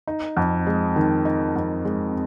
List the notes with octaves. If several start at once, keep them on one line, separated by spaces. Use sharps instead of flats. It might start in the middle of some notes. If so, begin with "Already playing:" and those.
D#4
F2
G#3
D#3
D#4
F2
G#3